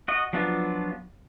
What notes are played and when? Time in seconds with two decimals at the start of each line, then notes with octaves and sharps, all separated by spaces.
0.08 F#4 D#5
0.33 F3 F#3 B3 D4 F4